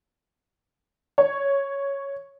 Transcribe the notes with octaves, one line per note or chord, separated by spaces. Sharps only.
C#5